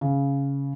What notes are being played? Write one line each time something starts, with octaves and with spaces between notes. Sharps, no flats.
C#3